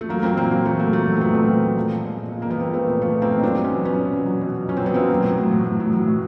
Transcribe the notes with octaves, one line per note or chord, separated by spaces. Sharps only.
A3
F#3 A#3
F#3 A#3 C4
A#2 A#3 C4
F#3 A#3
F#3 A3
F#3 A#3
F#3 A3
F#3 A#3
C4
F#3 A3 B3
A#2 A#3 C4
F#3
F#3
F3
A#2
G#3
A#2
A#2
F3 A#3
B3
F3 A#3 C4
G#3 A3 B3
A#2 A#3
F3 A3 B3
A#2
A#3 C4
F3
D#4
F#3 C4 D4
F#3
B3 C#4
F#3
F#3 B3 C#4
B2
F#3
F#3
B2
B2
F#3 C#4
C4
F#3 B3
B2 A#3 C4
F#3
A2
F#3
A2
A2
F#3
F#3
A2